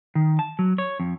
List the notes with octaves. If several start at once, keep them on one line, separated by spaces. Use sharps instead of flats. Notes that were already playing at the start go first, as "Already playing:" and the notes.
D#3
A5
F#3
C#5
F2